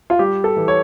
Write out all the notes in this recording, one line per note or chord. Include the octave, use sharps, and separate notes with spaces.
F4
G3 G4
A4
E3
C#5